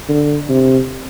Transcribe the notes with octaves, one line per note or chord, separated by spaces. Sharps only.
D3
C3